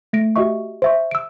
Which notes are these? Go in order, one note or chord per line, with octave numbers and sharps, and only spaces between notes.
A3 A#6 D7
F#4 G4 D#5 E5 C#6
C5 E5 C#6
E6 D7